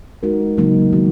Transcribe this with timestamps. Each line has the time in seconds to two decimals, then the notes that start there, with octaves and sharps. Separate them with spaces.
0.23 G#3 D#4 F#4 A#4
0.57 C#3 F#3 A#3 D#4
0.93 D#3 F#3 B3 F#4